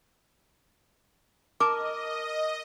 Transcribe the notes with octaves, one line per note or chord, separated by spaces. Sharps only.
A#4 D#5 A5 D6